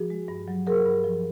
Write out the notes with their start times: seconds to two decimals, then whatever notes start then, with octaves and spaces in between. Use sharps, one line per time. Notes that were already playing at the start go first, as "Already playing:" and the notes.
Already playing: F3 F#4 G#4
0.10 G#3
0.28 G2
0.48 F#3
0.67 F#3 G#4 A#4
0.86 G2
1.04 F3